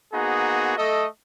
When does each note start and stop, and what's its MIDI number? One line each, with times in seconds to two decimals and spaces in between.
0.13 0.77 58
0.13 0.77 59
0.13 0.77 63
0.13 0.77 66
0.13 0.77 68
0.77 1.06 57
0.77 1.06 69
0.77 1.06 75